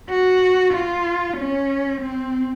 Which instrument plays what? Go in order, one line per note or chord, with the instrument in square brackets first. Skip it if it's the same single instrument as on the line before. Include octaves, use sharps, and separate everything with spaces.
[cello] F#4
F4
C#4
C4